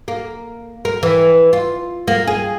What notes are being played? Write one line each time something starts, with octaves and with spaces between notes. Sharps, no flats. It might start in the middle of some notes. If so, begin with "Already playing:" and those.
A#3
A#4
E3
F4
A#3
G#4